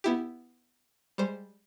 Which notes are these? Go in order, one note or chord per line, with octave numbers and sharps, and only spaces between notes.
B3 E4 G4
G3 G#3 C5